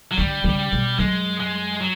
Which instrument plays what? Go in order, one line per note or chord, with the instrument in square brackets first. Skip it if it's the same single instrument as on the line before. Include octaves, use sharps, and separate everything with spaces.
[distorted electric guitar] F#3
[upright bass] D3 [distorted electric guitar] G3
[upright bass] C#3
B2
[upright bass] F#2 [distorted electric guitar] G#3
[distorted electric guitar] G#3
F#3